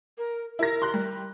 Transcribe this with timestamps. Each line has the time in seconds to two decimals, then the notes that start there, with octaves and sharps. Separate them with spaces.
0.18 A#4
0.59 E4 A#4 A#6
0.82 C6 F#6
0.94 G3